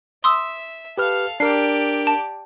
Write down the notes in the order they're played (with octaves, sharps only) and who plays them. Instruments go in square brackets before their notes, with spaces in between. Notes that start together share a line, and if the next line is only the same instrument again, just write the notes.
[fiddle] E5 [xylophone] C6 D#6 E6
[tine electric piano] G4 B4 F6 [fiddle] A4 F5
[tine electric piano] D4 A#4 [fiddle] G4 D5 [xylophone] C7
[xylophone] A5